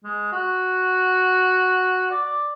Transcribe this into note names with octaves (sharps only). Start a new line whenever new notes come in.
G#3
F#4
D5